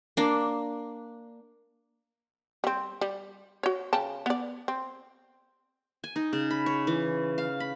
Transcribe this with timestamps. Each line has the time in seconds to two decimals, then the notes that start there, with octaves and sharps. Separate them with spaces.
0.17 A#3 D4
2.64 G3 C4
3.01 G3
3.63 F#4 C#5
3.93 C#3 G5 A5
4.26 B3 D5
4.68 C4
6.04 G#5
6.16 D#4
6.33 C#3
6.50 B5
6.66 C#5
6.87 E3
7.38 F5
7.60 B5